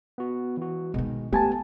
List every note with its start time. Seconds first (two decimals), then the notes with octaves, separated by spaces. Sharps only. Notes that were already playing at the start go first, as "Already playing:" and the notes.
0.18 B3 F#4
0.57 E3 F#4
0.94 B2 D#3 G#3
1.33 A3 B3 G4 G#5 A5